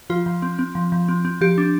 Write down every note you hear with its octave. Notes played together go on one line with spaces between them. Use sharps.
F3 F4
F3
C4
C4
F3
F3
C4
C4
F3 G4
D4